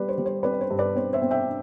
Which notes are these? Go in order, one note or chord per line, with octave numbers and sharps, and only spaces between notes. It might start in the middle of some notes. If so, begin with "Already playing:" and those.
Already playing: G3 B4 D5
C5
G3
C5
C4 B4 D5
D5
C5
G2
B4 D5
C4 C5
C5 E5
C4
E5 G5